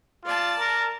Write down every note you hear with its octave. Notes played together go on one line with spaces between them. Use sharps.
F4 D5 A5
A#4